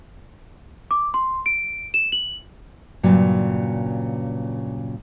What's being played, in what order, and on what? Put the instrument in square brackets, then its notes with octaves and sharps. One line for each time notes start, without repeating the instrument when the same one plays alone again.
[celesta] D6
C6
D7
E7
F#7
[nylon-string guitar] G2 A#2 C#3 F#3